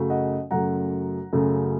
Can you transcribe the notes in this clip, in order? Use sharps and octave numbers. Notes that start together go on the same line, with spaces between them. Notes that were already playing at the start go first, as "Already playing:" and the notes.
Already playing: F#2 C#3 F#3 A3
D#5 F#5
F#2 C#3 F#3 A3 F#5 A#5
F#2 C#3 F#3 A3